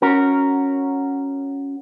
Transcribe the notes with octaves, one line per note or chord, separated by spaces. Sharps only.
C#4 F#4 A#4